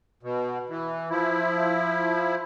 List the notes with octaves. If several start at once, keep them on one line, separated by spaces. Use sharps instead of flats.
B2
E3
F3 E4